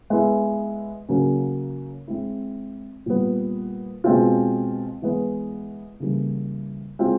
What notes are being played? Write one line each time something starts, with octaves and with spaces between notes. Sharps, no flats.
G#3 B3 E4
C#3 F#3 A#3 C#4
G#3 C4 E4
A#2 G3 B3
B2 G#3 C4 F4
E3 G#3 B3
C#3 E3 G3 A#3
G#3 C4 F4